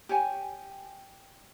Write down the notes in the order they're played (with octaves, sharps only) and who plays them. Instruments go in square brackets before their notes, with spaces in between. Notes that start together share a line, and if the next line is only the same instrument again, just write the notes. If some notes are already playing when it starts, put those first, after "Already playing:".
[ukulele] G4 C#5 G#5